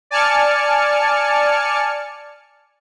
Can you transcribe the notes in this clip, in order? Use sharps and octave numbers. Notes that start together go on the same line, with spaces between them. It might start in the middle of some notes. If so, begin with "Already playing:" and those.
D5 G#5 A5 F6 C#7